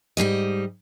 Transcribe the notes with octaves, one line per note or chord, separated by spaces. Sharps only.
G#2 C#3 G3 D#5